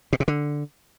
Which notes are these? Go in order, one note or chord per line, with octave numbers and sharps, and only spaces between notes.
B2
C3
D3